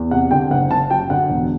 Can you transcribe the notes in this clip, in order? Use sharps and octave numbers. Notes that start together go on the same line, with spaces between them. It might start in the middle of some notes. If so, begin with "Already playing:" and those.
Already playing: E2
C3 F#5
D3 G5
F#1 F#5
F#1 A5
F#2 G5
D3 F#5
E1